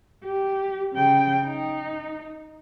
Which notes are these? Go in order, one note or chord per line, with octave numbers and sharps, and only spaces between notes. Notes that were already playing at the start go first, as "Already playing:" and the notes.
G4
C#3 G5
D#4